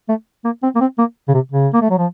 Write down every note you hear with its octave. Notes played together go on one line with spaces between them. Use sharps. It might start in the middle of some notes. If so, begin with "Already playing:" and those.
A3
A#3
C4
A#3
C4
A#3
C#3
C3
C#3
A#3
A3
F#3
F3